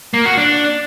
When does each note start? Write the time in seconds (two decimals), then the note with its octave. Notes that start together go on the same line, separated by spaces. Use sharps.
0.14 A#3
0.25 F#4
0.37 D4